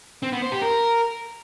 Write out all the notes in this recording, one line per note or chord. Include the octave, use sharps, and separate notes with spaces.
C4
B3
C5
G4
A#4